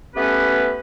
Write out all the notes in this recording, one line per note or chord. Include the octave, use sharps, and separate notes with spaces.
A3 B3 C#4 G4 B4